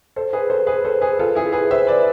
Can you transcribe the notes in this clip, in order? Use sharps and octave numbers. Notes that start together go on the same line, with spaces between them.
A4 C5
G#4 B4
A4 C5
G#4 B4
A4 C5
G#4 B4
F4 A4
E4 G#4
G#4 B4
C5 E5
B4 D5